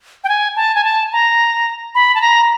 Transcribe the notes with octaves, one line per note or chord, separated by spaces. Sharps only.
G5
G#5
A5
G#5
A5
A#5
B5
A5
A#5